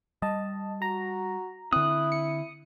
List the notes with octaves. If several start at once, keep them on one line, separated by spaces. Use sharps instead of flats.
G3 D#5 A5
F#4 A#5
D3 C4 E4 D#6 F#6
C#7